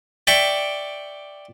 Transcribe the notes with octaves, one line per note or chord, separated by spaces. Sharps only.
D5 E5 G5 C#6 D6